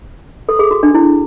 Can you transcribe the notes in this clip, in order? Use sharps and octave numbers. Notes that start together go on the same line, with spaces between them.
A4
G#4
F#4
D4
E4